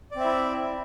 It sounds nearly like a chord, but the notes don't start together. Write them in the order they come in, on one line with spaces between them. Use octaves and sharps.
D5 C4 E5 E4